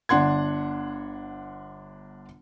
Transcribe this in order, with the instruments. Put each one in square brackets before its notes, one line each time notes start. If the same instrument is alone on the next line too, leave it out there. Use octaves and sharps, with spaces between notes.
[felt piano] G1 D4 F#5 C6 G#6